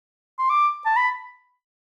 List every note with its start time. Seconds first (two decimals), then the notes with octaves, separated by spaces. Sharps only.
0.39 C6
0.50 D6
0.85 A5
0.96 B5